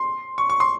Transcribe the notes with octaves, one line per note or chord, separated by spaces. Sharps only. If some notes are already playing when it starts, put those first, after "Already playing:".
Already playing: C6
C#6
C#6
C6